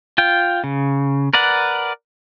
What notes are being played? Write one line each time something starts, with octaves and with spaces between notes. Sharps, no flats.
F4 G5
C#3
A#4 B4 D5 F#5